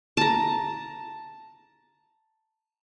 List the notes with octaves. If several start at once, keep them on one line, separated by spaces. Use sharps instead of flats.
A5 A#5